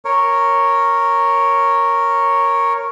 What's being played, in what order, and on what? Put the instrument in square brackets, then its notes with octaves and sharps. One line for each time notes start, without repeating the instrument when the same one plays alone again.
[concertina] A#4 C#5